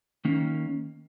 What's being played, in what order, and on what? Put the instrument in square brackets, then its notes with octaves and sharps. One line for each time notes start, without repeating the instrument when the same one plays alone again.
[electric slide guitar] D#3 A#3 C#4